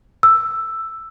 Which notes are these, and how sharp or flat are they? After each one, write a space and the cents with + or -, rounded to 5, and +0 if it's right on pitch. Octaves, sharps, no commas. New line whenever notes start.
E6 +5